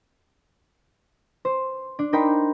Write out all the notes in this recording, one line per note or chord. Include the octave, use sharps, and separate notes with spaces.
C5
D4
D#4 A#4 G5 B5 C6